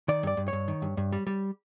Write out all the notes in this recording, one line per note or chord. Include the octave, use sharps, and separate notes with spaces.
D#3 D5
G2 D5
G2
G2 C#5
D#3
G2
G2
G3
G3